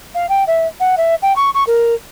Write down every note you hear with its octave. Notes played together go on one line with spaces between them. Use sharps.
F5
G5
E5
F#5
E5
G5
C#6
C#6
A#4